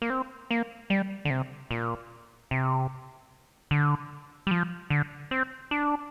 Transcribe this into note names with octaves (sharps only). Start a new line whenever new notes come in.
A#3
C4
A#3
G3
D3
C3
A#2
C3
D3
G3
F3
D3
C4
D4